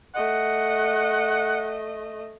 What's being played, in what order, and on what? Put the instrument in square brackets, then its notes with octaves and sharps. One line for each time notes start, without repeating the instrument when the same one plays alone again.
[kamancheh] A3 D#5 [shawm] F#5